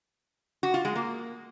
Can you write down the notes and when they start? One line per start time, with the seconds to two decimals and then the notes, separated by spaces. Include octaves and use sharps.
0.63 F#4
0.74 F4
0.85 G#3
0.96 A#3